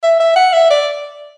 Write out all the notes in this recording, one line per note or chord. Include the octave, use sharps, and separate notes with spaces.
E5
E5
F#5
E5
D5